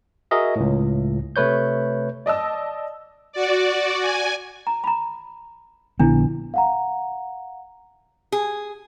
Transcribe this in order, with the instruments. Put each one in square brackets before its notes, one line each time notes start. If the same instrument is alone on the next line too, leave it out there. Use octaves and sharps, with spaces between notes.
[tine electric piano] F#4 G#4 A#4 D#5 E5
C#2 A2
C3 A3 B4 C#5 G6
[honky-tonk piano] D5 D#5 A5 E6
[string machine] F#4 D5
G#5
[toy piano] A#5
A#5 B5
[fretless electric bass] A#1 D3 B3 [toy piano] D4 E4
[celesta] F5 F#5 A#5
[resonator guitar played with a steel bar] G#4